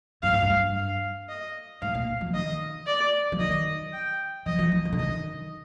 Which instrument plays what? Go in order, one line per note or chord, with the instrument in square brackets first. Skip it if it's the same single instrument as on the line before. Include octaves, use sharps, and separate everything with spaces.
[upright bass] G2 [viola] F5
[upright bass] G#2
G2
[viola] F5
D#5
[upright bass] G#2 [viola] F5
[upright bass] A#2
F3
[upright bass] D#3 [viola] D#5
[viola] D5
[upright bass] F3
[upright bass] D#3 [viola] D#5
[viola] G5
[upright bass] F3 [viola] D#5
[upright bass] F3
D#3
F3
D3
[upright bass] D#3 [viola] D#5